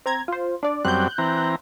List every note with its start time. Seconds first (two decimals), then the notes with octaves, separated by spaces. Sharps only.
0.06 C4 A#5 G#6
0.28 F4 C5
0.63 D4 D5
0.85 F#2 G3 C4 F#6 G6
1.18 E3 C4 A#5